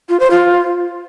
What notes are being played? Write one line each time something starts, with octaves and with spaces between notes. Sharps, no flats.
F4
C5
F4